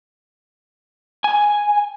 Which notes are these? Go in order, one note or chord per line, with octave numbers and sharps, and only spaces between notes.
G#5